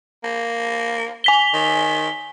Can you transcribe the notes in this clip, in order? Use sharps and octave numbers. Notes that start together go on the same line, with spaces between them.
A#3
G#5 B6 G7
D#3